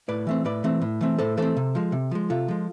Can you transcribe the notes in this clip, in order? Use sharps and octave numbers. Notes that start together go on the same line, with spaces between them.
A2 B4 D5
E3 A3 C4
A2 B4 D5
E3 A3 C4
A2
E3 A3 C4
A2 A4 C5
E3 A3 C4 A4 C5
C3
F3 G#3
C3
F3 G#3
C3 F4 A4
F3 G#3